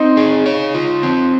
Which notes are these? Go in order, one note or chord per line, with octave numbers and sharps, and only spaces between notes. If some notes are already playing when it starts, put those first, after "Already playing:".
Already playing: C4 D#4
G#4
C#5
F4
C4